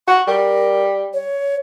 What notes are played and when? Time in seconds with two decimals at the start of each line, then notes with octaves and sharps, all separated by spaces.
0.08 F#4 C#6
0.27 G3 A#4
1.13 C#5